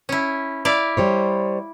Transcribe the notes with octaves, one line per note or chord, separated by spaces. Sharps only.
C#4 E4
E4 D5 F5
G3 C5 C#5